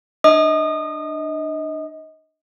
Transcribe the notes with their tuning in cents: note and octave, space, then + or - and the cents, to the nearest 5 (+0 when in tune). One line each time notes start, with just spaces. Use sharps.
D4 +25 D#5 +25 D#6 -30